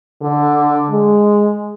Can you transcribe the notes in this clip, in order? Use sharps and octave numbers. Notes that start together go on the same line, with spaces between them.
D3
G#3